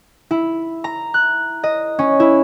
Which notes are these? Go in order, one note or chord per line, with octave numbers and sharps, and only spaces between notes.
E4
A#5
F#6
D#5
C#4
E4